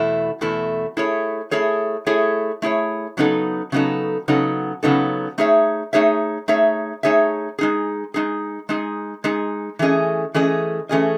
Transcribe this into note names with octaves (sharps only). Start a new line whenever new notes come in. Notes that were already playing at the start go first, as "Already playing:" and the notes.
Already playing: E2 B2 A3 E4
E2 B2 A3 E4
A3 E4 G#4 C#5
A3 E4 G#4 C#5
A3 E4 G#4 C#5
A3 E4 G#4 C#5
C#3 F#3 B3 D#4 A4
C#3 F#3 B3 D#4 A4
C#3 F#3 B3 D#4 A4
C#3 F#3 B3 D#4 A4
A3 D#4 G#4 C#5 E5
A3 D#4 G#4 C#5 E5
A3 D#4 G#4 C#5 E5
A3 D#4 G#4 C#5 E5
G#3 D#4 G#4
G#3 D#4 G#4
G#3 D#4 G#4
G#3 D#4 G#4
E3 A3 C#4 G#4 D#5
E3 A3 C#4 G#4 D#5
E3 A3 C#4 G#4 D#5